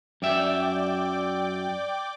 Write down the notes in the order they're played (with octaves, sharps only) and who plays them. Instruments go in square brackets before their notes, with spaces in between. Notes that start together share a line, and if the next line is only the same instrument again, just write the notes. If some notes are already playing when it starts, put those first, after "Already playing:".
[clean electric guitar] F#2 E5 [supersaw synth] D5 G5 D6